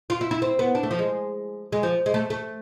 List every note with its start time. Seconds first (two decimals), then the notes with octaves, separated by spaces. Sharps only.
0.10 F4
0.21 E4
0.31 E4
0.42 C4
0.59 B3
0.75 D4
0.83 A3
0.91 F3
0.99 G#3
1.72 G#3
1.83 F3
2.06 G#3
2.14 A3
2.30 A3